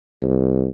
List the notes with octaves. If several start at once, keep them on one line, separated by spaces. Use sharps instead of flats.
C2